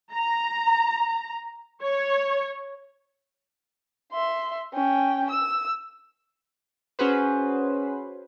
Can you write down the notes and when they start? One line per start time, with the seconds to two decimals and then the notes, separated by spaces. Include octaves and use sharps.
0.13 A#5
1.82 C#5
4.12 E5 C6
4.74 C#4 G5
5.30 E6
6.99 C#4 F#4 G#4 B4 C5